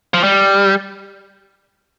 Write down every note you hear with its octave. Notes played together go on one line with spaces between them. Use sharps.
F3
G3